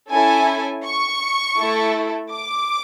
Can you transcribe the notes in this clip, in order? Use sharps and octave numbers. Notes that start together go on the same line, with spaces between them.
C#4 E4 A4 G#5
C#6
A3 E4 A4
D6